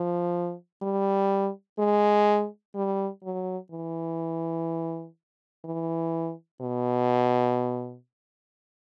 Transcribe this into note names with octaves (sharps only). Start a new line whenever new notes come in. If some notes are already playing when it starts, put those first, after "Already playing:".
Already playing: F3
G3
G#3
G3
F#3
E3
E3
B2